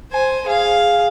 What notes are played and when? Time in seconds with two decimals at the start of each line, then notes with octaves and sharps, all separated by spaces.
0.12 C5 G#5
0.47 G#4 F5